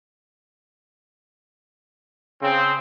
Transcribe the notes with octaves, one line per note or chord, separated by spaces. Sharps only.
C#3 C4